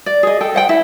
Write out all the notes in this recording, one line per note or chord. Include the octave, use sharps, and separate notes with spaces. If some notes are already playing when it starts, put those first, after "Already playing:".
D5
G#4 D#5
A4 G5
C5 F#5 G5
E4